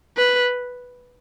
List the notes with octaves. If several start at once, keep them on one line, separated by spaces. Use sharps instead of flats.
B4